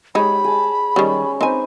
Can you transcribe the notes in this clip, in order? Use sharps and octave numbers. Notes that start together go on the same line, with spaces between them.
G#3 D#4 G4 C#5 B5
G#4 A5
D#3 G3 G#3 C#4
C4 D#4 B4 C5 G#5